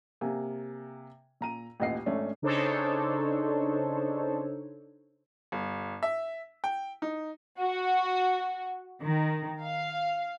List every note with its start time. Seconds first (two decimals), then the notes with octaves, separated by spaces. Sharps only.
0.21 C3 A#3 G#5
1.41 A#2 A#5 D#7
1.80 A1 D#2 A#2 D#5 F#5 C7
2.06 G#1 A3 C#4 D4
2.42 C#3 D4 D#4 A4 C5 C#5
5.52 G1
6.03 E5
6.64 G5
7.02 D#4
7.60 F#4
9.03 D#3
9.62 F5